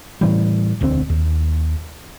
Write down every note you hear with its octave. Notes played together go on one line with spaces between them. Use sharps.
A2 E3 G3
E1 D2 A#3 C4
D#2